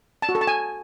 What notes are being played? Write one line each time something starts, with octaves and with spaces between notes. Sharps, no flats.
A5
F#4
A4
A5
G#5